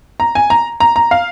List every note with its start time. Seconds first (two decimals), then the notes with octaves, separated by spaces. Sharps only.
0.20 A#5
0.35 G#5
0.50 A#5
0.80 A#5
0.96 A#5
1.11 F5